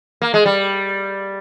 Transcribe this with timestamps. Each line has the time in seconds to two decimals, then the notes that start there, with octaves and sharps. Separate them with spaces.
0.22 A#3
0.34 G#3
0.45 G3